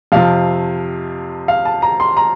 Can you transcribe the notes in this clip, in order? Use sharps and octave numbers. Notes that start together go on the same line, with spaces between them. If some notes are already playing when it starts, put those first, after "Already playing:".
F2 C3 F3 F5
F5
A5
A#5
C6
A#5